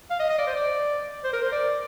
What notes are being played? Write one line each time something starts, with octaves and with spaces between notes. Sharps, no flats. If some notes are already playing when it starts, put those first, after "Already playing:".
F5
D#5
D#5
D5
C5
D5
C5
A#4
C5
D5